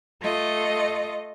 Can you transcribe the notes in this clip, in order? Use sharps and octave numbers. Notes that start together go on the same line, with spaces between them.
A3 F4 D#5